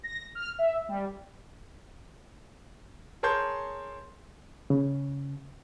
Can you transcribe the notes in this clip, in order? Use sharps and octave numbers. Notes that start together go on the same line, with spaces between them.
A#6
F6
E5
G3
G#4 A#4 C#5 A5 C6 G6
C#3